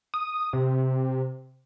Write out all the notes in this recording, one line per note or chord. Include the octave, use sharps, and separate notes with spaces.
D#6
C3